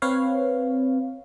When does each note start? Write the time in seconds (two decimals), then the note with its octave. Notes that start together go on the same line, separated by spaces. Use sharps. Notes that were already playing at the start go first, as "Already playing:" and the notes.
0.02 C4 B4 C#5 F5